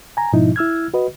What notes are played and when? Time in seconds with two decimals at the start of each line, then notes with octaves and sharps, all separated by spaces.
0.17 G#5 A#5
0.33 G#2 B2 F3 D#4 E4
0.56 E4 E6 F6 G#6
0.94 F#4 B4 D#5